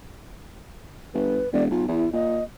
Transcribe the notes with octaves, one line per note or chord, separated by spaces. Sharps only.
G1 B4
E1 D5
B1 F4
E2 E4
A#2 D#5